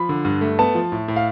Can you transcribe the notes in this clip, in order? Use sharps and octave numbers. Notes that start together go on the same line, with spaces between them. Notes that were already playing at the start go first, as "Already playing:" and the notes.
Already playing: F3 B5
D3
G2
A3
B3 A5
F3
A2
A2
F5